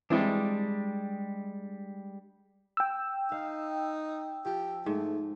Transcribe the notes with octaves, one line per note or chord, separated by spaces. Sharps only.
E3 G3 G#3 C4 D4 E4
G5 E6
D#4 F5
F3 G4
G#2 A3